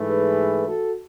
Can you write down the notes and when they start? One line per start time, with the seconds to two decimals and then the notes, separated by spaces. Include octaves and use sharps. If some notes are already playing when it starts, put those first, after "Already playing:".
Already playing: G#2 E3 A3
0.09 G#4 B4
0.66 F#4 A4